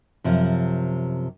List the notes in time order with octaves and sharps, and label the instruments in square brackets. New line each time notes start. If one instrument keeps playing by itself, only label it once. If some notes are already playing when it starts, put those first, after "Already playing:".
[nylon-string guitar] F#2 C3 F3